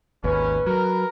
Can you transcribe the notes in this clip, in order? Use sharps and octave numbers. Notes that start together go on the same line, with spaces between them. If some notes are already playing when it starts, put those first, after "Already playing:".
G#1 D#2 C#4 B4
F#3 A#4